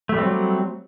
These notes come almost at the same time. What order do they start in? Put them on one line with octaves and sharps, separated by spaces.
A3 G3 C4 F#3